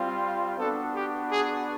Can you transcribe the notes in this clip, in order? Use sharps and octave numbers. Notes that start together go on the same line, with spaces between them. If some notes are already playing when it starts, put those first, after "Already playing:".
Already playing: G3 C4 F4
B3 D4 F#4 A4
G4
G#4